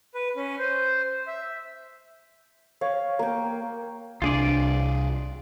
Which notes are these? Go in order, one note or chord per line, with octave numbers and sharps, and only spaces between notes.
B4
C#4
C5
E5
C#5 F5
A#3 G5
C2 F#3 D4 F4 G#4 D5